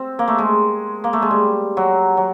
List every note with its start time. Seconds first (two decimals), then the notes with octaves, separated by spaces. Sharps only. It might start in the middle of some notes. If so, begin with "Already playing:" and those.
Already playing: C4
0.19 A#3
0.28 A3
0.38 G#3
1.04 A#3
1.13 A3
1.22 G#3
1.31 G3
1.77 F#3
2.17 F#3